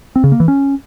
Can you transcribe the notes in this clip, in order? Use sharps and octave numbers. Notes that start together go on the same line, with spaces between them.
C4
C#3
A#3
E3
C#4